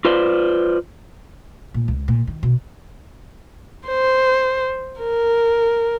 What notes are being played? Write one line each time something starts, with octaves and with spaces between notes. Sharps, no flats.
F4 B4 C5 D5
A#2
C#2
A#2
D#3
B2
C5
A#4